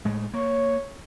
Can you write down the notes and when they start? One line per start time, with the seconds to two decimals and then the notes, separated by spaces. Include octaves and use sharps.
0.05 A2 G#3 A3
0.34 A#3 C#5